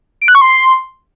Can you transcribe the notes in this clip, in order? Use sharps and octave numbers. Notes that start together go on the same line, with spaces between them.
D7
F#6
C#6
C6